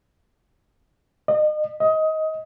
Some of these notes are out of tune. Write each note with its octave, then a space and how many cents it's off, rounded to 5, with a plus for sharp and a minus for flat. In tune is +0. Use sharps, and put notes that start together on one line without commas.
D#5 -35
D#5 +20